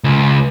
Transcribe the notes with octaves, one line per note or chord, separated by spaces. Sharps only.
C#2